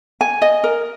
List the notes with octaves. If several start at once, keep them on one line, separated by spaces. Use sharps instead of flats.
G#5
D#5
A#4